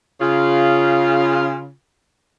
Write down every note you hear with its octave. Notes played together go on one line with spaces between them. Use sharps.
C#3 F4